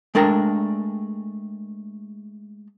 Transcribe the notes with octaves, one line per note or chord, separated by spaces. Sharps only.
G#3 A3 D4 A#4 G5 A#5